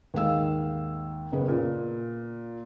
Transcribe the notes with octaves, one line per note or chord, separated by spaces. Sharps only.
D#2 G#2 F5 E6
F#1 C#3 B3
A#2